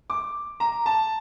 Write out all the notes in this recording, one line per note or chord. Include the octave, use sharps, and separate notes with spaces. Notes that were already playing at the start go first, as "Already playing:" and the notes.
D6
A#5
A5